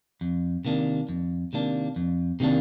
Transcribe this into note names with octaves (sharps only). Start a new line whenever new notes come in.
F2
C3 D#3 A#3 D4
F2
C3 D#3 A#3 D4
F2
C3 D#3 A#3 D4